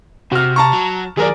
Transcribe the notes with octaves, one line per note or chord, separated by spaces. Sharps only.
C3 F#4 F6
A5 A#5 C#6
F#3
D#3 F#3 G#4 A#4 D5